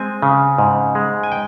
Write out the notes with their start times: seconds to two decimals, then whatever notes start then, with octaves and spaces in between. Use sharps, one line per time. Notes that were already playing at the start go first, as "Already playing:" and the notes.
Already playing: G#3 C4 G#5
0.23 C#3
0.58 G#2
0.95 G#3
1.23 G#5
1.32 G5